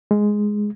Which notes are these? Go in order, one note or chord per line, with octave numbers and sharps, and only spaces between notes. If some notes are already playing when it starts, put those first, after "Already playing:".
G#3